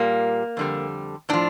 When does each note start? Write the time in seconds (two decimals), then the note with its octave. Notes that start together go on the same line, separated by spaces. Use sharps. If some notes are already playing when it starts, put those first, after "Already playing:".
Already playing: A#2 G3 A#3
0.57 F2 D3 G3
1.29 A2 F3 D4